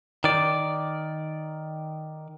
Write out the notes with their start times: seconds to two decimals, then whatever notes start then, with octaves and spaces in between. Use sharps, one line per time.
0.24 D#3 D5